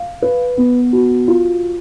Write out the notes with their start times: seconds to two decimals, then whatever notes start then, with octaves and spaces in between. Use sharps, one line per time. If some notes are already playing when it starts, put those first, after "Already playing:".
Already playing: F5
0.22 B4
0.57 B3
0.93 F#4
1.28 F4